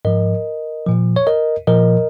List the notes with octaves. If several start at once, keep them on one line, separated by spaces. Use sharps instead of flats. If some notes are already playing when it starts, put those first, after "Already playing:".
G#2 F3 A#4 D#5
A#2 F3
C#5
A#4 D#5
A#2 F3 A#4 D#5